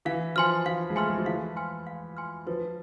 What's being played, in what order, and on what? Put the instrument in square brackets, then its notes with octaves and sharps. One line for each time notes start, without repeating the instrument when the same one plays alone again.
[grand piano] E3 [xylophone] F5
[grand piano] F3 [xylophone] G#5 C6 F6
[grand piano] F3 [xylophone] F5
[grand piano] G#3
[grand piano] A3 [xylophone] G#5 C6 F6
[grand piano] G#3
F3
[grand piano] E3 [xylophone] F5
[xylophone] G#5 C6 F6
F5
G#5 C6 F6
[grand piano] F3 [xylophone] B4